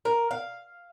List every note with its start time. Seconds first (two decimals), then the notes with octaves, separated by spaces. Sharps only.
0.05 A#4
0.31 F5